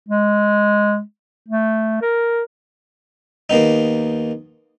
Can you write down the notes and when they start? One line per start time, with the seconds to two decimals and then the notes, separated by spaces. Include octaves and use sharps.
0.09 G#3
1.48 A3
2.02 A#4
3.50 D#2 A#3 B3 D#4